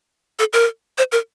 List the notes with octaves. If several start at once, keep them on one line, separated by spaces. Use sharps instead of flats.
A4
A#4
C5
A#4